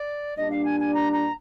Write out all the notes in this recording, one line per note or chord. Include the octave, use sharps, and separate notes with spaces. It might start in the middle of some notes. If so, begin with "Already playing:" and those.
Already playing: D5
A#2 G3 D4 D#5
F5
G#5
G#5
A#5
A#5